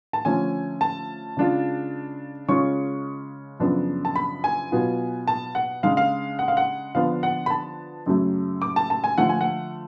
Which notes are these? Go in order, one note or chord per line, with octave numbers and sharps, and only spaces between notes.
A5
D3 F3 A3 C#4 G#5
A5
C#3 G#3 D4 F4
C#3 G#3 C#4 F4 C#6
F#2 C#3 F3 B3 D4
A5
B5
G#5
B2 F#3 B3 F4
A5
F#5
C#3 G#3 D4 F5
F5
F#5
F5
F#5
D3 F3 B3 D4 F5
F#5
B5
A5
F#2 C#3 F#3 A3
D6
A5
A5
G#5
D3 F3 A3 F4 F#5
G#5
F#5